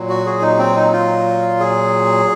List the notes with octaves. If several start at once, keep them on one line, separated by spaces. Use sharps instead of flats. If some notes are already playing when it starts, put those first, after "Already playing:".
Already playing: A#2 F#3
F#4
G#4
D#4
C4
D#4
F4
G#4